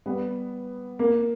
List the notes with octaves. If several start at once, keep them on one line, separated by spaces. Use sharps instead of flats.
G3 B3
A#3